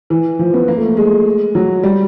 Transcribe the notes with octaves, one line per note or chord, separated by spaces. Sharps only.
E3
F3
B3
A#3
A3
G#3
F#3
G3